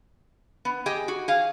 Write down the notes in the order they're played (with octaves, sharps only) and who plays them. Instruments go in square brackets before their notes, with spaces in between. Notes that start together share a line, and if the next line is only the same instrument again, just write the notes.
[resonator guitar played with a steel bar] B3
G4 G#4 D#5 G5
F#4
G#4 F5